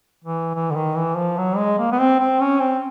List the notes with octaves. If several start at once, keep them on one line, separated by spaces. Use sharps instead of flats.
E3
E3
D3
D#3
E3
F3
F#3
G#3
A#3
B3
C4
C4
C#4
C4